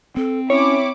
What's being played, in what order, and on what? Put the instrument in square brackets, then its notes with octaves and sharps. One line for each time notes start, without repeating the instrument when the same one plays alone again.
[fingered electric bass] C4 [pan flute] A4
[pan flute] C#4 [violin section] E4 D6 [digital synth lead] C#5